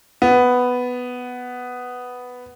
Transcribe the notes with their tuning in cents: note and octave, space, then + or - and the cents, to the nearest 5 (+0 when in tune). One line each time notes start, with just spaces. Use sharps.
B3 +5